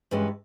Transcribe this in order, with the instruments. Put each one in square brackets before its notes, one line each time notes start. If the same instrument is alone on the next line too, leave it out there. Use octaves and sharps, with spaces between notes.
[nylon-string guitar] G2 E3 G#3 C#4